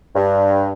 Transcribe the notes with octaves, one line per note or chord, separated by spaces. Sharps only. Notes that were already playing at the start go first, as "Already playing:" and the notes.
G2